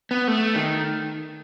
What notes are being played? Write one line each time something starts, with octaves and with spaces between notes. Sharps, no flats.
B3
A3
D#3